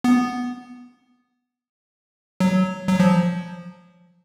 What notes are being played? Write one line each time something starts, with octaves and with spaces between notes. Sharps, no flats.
B3
F#3
F#3
F3